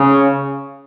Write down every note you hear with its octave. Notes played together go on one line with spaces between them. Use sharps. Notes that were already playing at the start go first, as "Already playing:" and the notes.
Already playing: C#3